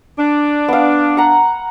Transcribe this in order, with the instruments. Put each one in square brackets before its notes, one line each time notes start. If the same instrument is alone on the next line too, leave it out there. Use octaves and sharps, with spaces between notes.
[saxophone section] D4
[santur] B3 F5
F#5 A#5